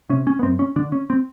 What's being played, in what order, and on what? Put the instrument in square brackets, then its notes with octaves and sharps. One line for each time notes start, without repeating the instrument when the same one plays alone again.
[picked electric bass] C3 C#4
C#4
B3
F#2 C4
C#4
D3 D4
C#4
C4